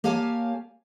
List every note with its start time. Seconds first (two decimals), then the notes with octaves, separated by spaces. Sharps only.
0.04 A#3 G4 C#5 F5 G#5 A5